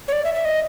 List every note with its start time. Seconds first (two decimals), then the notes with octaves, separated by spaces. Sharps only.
0.08 C#5
0.13 D5
0.24 E5
0.34 E5
0.45 D#5